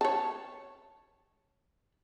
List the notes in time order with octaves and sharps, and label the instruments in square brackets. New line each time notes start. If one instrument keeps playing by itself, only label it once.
[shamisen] C#5 A5